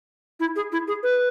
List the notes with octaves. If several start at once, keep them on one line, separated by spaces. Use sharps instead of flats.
E4
G#4
E4
G#4
B4